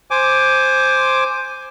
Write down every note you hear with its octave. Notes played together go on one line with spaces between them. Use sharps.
C5 G#5 D6